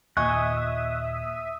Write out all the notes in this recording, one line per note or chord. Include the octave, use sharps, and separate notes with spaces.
D#2 A#2 D#5 E5 G#5 C#6 D#6 F#6